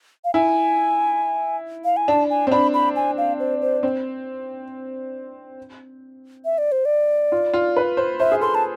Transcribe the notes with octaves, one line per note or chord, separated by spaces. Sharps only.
F5
E4 G#5
F5
G#5
D4 A5
G#5
C4
D4 B5
B5
G#5
F5
C5
C5
C4
E5
D5
C5
D5
F4
F4
B4
C5
C5 E5
G#4
A4 C6
A5